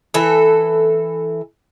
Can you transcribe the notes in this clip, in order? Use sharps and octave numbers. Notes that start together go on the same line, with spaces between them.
E3 A4